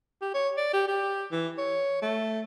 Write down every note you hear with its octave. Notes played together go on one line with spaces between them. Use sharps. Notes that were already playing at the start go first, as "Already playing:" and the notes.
G4
C#5
D5
G4
G4
E3
C#5
A3